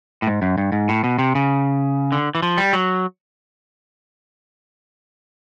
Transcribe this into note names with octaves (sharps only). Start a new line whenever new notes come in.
A2
G#2
F#2
G2
G#2
A2
B2
C3
C#3
D3
E3
F3
G3
F#3